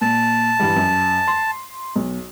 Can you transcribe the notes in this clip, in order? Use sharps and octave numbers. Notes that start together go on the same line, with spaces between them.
A#2 A5
G2 E3 G3
F#2
C6
B1